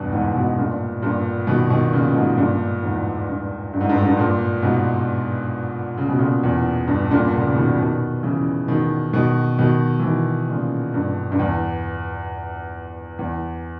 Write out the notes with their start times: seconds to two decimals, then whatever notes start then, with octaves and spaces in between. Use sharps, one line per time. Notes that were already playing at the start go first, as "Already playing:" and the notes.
Already playing: E2 G2 B2
0.13 E2 G#2
0.35 G#2 B2
0.58 G2 A#2
1.02 G2 A#2
1.47 B2 D#3
1.70 B2 D#3
1.92 A#2 C#3
2.15 G#2 B2
2.37 G2 A#2
2.83 E2 G#2
3.28 G2
3.73 G2
3.81 G#2
3.89 G2
3.98 G#2
4.06 G2
4.17 G2 A#2
4.63 G#2 B2
5.97 C#3
6.09 B2
6.18 A#2 C#3
6.43 E2
6.88 G2
7.10 G2 A#2
7.33 A#2 C#3
7.47 C#3
7.55 B2 D#3
7.78 B2 D#3
8.23 C#3 E3
8.68 B2 D#3
9.13 B2 D#3
9.58 B2 D#3
9.99 E3
10.04 B2 D#3
10.48 A#2 C#3
10.94 G2
11.32 G2
11.39 E2
13.19 E2